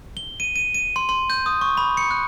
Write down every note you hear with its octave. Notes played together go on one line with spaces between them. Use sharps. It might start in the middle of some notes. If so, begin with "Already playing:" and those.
G7
D#7
D#7
D#7
C6
C6
G6
D#6
C#6
B5
C#7
F#6